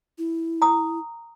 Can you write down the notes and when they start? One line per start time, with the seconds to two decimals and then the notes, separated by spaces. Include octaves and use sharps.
0.18 E4
0.62 A#5 D#6